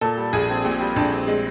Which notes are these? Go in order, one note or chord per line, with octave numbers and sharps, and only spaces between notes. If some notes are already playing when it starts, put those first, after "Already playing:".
A#2 A4
G3
A#1 G#4
C4
A#2 G4
G3
A#1 D4
C4
G#3